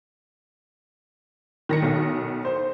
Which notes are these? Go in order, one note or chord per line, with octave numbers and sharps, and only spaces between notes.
D#3 A#6 C#7
B1
C5